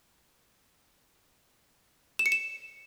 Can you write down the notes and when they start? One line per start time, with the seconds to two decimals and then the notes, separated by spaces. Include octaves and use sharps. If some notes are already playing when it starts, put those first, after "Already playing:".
2.19 E7
2.26 C#7
2.32 E7